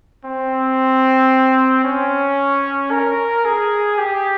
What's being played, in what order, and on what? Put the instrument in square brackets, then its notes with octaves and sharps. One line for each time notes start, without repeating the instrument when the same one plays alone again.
[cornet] C4
C#4
A#4
G#4
G4